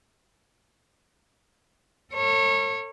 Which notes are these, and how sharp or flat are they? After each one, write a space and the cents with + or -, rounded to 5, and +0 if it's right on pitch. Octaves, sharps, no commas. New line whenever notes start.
A4 +40 C#5 -25